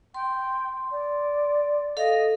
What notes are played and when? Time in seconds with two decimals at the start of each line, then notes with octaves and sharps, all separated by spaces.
0.14 G5 C6
0.91 D5
1.97 A4 D#5 F5